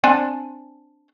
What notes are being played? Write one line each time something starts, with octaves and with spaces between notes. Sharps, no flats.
C4 D4 G#5